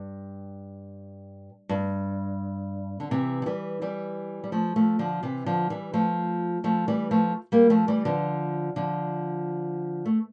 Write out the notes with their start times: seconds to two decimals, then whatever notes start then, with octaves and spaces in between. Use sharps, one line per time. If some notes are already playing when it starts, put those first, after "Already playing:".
Already playing: G2
1.69 G2
3.00 D3
3.11 C3 E3
3.42 F3
3.46 E3 G3
3.82 E3 G3
4.44 G3
4.52 F3 A3
4.76 F3 A3
4.99 D3 F3
5.23 C3 E3
5.46 D3 F3
5.70 E3 G3
5.93 F3 A3
6.64 F3 A3
6.88 E3 G3
7.11 F3 A3
7.52 G3 A#3
7.70 F3 A3
7.88 E3 G3
8.05 D3 F3
8.76 D3 F3
10.06 A3